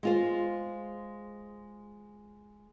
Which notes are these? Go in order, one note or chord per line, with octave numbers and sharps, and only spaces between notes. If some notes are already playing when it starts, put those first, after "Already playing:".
G#3 F4 C5